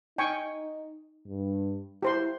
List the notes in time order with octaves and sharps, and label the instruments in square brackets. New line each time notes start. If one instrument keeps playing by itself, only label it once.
[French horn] D#4 [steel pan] G5 G#5 C#6
[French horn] G2
[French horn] E4 [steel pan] G4 C5 C6